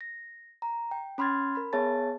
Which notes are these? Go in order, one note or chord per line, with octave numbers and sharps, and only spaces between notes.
A#6
A#5
G5
C#4 B5 C6 F6 G#6 A6
A#4 B5
B3 G#4 C#5 E5 A5 A6